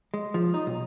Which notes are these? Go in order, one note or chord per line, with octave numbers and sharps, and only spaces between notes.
G#3
F3
D#4
B1